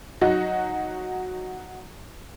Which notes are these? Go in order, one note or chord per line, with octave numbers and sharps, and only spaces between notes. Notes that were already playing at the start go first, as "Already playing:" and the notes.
F#3 D#4 F#4